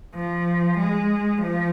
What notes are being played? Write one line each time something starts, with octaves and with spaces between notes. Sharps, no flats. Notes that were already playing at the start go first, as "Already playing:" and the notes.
F3
G#3
F3